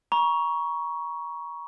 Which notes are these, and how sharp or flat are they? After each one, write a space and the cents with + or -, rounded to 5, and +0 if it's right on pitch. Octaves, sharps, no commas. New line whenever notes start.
A#5 +35 C#6 +10